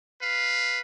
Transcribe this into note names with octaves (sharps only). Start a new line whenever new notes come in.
B4 F5